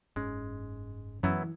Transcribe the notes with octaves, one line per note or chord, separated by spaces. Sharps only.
F#1 G#2 G#3 C#4
F#2 E3 F#3 B3 E4